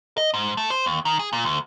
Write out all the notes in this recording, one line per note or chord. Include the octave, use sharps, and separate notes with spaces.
D#5
G#2
A3
C5
D#2
D#3
G#4
A#2
D2